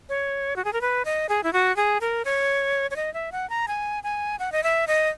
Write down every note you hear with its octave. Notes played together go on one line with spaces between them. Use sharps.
C#5
F#4
G#4
A#4
B4
D#5
G#4
E4
F#4
G#4
A#4
C#5
C#5
D#5
E5
F#5
A#5
G#5
G#5
F#5
D#5
E5
D#5